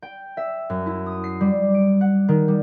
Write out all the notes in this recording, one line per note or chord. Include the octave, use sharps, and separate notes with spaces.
G5
E5
F#2
E4
D#6
C7
G3
D7
F#5
D#3
G3